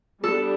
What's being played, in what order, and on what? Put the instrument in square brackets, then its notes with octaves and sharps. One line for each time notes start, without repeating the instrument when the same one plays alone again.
[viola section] G3 B3 D4 [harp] A4